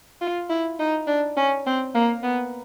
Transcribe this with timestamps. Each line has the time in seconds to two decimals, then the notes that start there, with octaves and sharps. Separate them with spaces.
0.21 F4
0.50 E4
0.79 D#4
1.07 D4
1.37 C#4
1.66 C4
1.95 A#3
2.23 B3